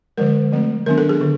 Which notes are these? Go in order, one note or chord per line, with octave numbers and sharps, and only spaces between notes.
D3 F3 G#3 A#4
F3 A3 C4
D#3 F#3 B3 D4 A#4
A4
G#4
D3